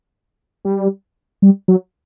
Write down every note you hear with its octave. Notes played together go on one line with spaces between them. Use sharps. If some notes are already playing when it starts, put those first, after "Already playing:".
G3
G3
F#3